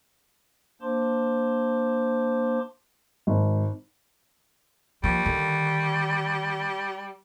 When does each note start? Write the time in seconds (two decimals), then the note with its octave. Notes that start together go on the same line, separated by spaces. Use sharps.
0.81 A#3 D4 C5 A5 C6 D6
3.27 G#1
5.04 F3 G3 A#3
5.25 D3 D#3